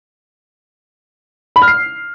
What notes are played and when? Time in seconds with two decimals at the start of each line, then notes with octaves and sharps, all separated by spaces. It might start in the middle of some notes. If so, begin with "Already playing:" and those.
1.56 B5
1.62 F6
1.68 C7